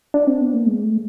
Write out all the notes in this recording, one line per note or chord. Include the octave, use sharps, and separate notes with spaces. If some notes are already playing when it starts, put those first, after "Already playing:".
D4
C4
B3
A#3
G#3
A3